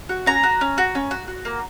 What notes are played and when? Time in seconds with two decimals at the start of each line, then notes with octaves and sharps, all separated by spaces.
0.09 F#4
0.26 C#4 A#5
0.43 F#4
0.61 C#4
0.78 F#4
0.95 C#4
1.11 F#4
1.28 F#4
1.45 A#3